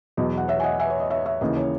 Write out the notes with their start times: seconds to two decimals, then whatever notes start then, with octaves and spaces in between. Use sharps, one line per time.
0.17 E2 B2 F#3 D#5
0.37 F#5
0.48 C#5 E5
0.60 G#5
0.64 D#5 F#5
0.80 E5 G#5
0.90 C#5
1.00 D#5
1.10 C#5 E5
1.25 C#5 E5
1.41 D#2 C#3 E3 D#5
1.56 C#5